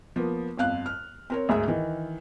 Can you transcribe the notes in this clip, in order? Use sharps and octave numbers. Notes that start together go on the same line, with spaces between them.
F3 A#3 B3
G1 F2 F5 F#6
F6
C4 A#4 C#5
D2 G#2 G#4 E5
D#3 E3